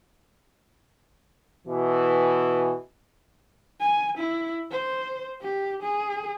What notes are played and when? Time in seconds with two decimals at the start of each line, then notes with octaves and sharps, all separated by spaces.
1.67 B2 E3
3.80 G#5
4.18 E4
4.71 C5
5.41 G4
5.82 G#4